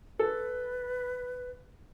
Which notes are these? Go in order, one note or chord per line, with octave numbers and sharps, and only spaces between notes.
A4 B4